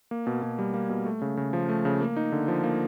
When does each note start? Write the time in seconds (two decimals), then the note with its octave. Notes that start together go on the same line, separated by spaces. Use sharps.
0.11 A#3
0.27 B2
0.43 B2
0.59 G3
0.74 A#3
0.90 B2
1.06 A3
1.22 C#3
1.37 C#3
1.53 F3
1.69 A3
1.85 C#3
2.01 A#3
2.16 D#4
2.32 D3
2.48 F3
2.64 A#3